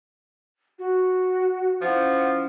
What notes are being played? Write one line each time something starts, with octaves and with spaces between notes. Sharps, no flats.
F#4
F3 C#4 E4 F#5